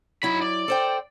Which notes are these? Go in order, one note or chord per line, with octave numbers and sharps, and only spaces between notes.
F#3 D#4 E4 B5
D5
A4 C5 G5